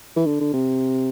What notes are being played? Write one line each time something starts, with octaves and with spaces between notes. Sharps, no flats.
E3
D3
D3
C3